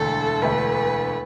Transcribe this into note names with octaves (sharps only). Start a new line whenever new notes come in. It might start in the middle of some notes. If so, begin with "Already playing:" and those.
Already playing: E1 D2 D3 A3 A4
E1 D2 D3 A3 B4